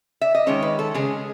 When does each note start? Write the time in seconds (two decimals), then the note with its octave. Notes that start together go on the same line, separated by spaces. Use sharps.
0.21 E5
0.35 D#5
0.46 D#3 G#3 C#4 C#5
0.62 B4
0.79 A4
0.94 C#3 G#3 C#4 G#4